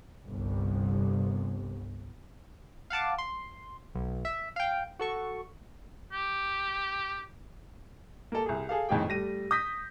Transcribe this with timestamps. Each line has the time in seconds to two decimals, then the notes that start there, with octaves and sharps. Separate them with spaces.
0.25 G1 C2
2.90 F5 F#5 A5 D6
3.18 C6
3.95 B1
4.25 E5
4.56 F5 G5
4.99 F#4 A4 C#6
6.12 G4
8.32 A#3 A4
8.46 C2 G#4
8.69 G#4 A4 F5
8.89 F2 A2 D#3 G#4 G5
9.08 G3 A3 A#6 D#7
9.51 D#6 G6 A#6 B6